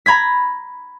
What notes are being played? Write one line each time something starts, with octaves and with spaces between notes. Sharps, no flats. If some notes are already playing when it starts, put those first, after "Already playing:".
A#5 B5 G#6 B6